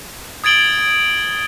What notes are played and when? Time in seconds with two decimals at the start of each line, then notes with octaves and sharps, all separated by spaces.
0.44 D#6 G#6 A6 D7 F#7 G7